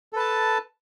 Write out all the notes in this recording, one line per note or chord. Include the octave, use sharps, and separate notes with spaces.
A4 B4 A5